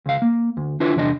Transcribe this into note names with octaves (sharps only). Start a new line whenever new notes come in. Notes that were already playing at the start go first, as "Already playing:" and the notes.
C#2 F5
A#3
D2
D4 E4 F4 B4
E2 C3 D4 D#5